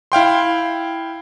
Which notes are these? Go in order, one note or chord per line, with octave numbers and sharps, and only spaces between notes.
E4 F5 G5 C6